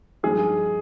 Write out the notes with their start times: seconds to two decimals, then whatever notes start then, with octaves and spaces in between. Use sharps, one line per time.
0.23 G2 F3 G#3 D#4 G#4